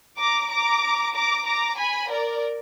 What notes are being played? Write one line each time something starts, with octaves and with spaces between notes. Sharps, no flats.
A#5 D6
A#5 D6
A#5 D6
A#5 D6
G#5 B5
A#4 D5